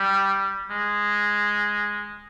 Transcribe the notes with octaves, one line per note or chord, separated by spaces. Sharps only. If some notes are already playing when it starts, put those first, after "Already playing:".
Already playing: G3
G#3